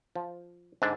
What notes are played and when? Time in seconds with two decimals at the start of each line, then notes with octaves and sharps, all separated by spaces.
0.15 F3
0.82 G#2 D3 D4